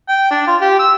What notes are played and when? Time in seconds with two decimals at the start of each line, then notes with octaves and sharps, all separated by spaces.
0.08 G5
0.31 D4
0.47 F4
0.61 G4
0.79 E6